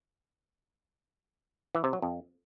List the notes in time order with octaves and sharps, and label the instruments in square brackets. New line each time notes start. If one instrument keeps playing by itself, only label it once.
[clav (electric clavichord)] E3
C3
F#3
F2